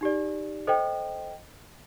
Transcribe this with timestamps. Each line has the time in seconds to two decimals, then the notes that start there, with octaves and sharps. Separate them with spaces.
0.01 D#4 G4 D5
0.67 A4 C5 D#5 G5